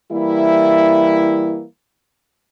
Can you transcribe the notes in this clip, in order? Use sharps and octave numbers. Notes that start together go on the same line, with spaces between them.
E3 G3 A#3 E4